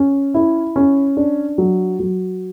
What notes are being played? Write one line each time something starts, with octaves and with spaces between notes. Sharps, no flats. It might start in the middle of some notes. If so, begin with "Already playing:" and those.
Already playing: C#4
E4
C#4
D4
F#3
F#3